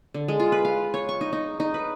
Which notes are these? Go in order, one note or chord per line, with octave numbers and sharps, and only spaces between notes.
D3
G#3
F4
B4
F5
C#5
C#6
D#4
D#4
D#4
B4